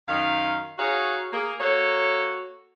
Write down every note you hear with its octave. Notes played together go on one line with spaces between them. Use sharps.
F#2 D#3 D#4 F5
D#4 F#4 G#4 C#5 F5
A#3 G#4
A#3 F#4 A4 C#5